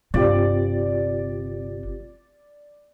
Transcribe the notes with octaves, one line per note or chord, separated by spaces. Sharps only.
G1 C3 C4 F4 G4 D5